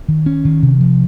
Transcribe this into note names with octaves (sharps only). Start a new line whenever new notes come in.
D#3
C#4
D#3
C3
F3